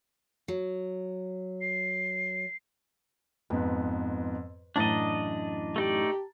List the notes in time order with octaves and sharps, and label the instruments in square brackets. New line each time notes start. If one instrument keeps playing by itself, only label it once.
[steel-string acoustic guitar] F#3
[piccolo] C7
[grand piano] F2 G#2 B3 [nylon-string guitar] B4
[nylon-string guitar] F#2 A2 E3 [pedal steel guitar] D4 D#5 [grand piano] A5 A#5 A6
[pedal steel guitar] A3 D#4 D5 [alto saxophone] G4